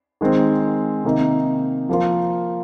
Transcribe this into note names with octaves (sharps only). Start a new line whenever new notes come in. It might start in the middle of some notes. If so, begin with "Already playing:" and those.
D#3 G#3 C4
C3 D#3 A#3 D#4
F3 A#3 F4